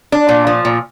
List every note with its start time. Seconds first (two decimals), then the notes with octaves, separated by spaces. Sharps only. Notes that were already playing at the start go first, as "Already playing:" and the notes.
0.12 D4
0.29 A#2
0.47 F3
0.65 A#2